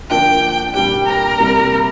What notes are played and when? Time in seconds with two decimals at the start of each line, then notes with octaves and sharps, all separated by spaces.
0.10 D3 F3 A#3 D4 G5
0.74 A#2 G3 D4 G4 G5
1.06 A#4
1.38 C3 G3 A#3